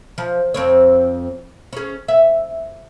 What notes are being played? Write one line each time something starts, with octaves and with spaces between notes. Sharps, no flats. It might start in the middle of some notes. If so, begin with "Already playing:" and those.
F3
F2 C4 C#5
C#4 G#4
E5